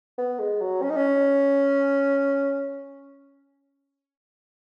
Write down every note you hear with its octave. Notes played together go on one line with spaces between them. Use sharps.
B3
G#3
F#3
C#4
D#4
C#4